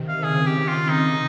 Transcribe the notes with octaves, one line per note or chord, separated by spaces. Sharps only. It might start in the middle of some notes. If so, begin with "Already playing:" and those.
Already playing: C3 D#3
F5
C#3 G#4
G4
F4
D#4